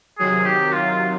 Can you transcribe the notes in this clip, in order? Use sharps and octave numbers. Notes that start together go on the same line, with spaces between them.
C3 D#3 F#3 G#4
G4
F4
F4